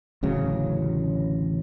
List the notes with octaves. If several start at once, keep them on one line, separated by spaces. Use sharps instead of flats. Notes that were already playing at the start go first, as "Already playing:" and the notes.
A1 D2 C#3 F#3